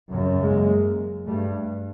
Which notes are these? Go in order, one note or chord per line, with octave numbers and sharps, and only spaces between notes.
F#2 C#3
G#3 A#3
G2 G3 A3